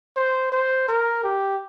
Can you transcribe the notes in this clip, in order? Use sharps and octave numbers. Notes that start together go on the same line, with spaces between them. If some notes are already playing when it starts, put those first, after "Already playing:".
C5
C5
A#4
G4